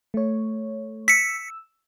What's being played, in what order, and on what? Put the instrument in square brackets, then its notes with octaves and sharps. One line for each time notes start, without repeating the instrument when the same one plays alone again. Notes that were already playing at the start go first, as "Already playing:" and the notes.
[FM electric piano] A3 C#5
[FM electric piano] E6 [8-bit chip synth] B6 C#7